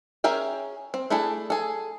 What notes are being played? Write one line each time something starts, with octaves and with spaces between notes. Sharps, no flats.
C#4 G#4 A#4 E5 G5
C4
A3 D4 E4 G#4 A4
G#4 A4